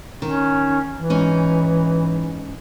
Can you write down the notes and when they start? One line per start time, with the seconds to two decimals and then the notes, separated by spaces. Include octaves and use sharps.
0.22 D#3 C#4
0.95 E3
1.10 G#2 C#4 D#4